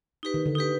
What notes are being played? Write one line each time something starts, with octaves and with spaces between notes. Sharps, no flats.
D#4 G4 B4
D#3
D3
D#4 G4 B4